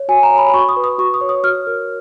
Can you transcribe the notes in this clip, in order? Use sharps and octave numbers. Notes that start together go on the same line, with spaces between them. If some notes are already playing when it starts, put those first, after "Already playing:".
Already playing: C#5
F#4 G#5
A#5
C#5
B5
B5
F#4 C#6
D#6
B4
D#6
F#4 C#6
D#6
C#5
D#6
F#4 F6
A#4